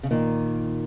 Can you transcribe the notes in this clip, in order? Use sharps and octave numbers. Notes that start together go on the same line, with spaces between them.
C#3
A#2 D#3